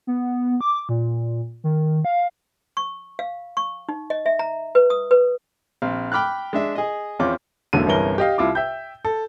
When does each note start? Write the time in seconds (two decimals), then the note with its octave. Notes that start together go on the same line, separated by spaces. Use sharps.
0.07 B3
0.61 D6
0.89 A#2
1.64 D#3
2.05 F5
2.77 C#6
3.19 F5
3.57 C#6
3.89 D#4
4.10 D#5
4.26 E5
4.39 A#5
4.75 B4
4.90 D#6
5.11 B4
5.82 A#1 C4 F5
6.12 G5 B5 D6 F6 F#6
6.53 G#3 D4 E5
6.75 G#4 D#5
7.19 E2 C4 C#4 F4 D6
7.73 E1 A1 D3 F#3 A#3 D#7
7.86 G1 C2 E3 C#4 A#4 G7
8.18 G4 D#5 F5
8.38 C2 E4 F4 D6
8.55 E5 G5 G6
9.05 A4